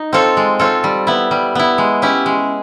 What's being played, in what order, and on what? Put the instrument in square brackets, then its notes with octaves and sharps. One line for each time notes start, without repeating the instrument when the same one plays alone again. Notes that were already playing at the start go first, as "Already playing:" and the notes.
Already playing: [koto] D#4
C4 F4 A4 C#5
G#3
C4 F4 A4 C#5
G3
B3 E4
G3
B3 E4
G#3
C#4 E4 G4
G#3